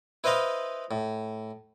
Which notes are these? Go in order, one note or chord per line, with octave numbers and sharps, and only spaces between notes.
E4 B4 C5 D#5 F5 B5
A2